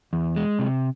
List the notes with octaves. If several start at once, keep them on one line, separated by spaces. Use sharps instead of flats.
E2
G#3
C3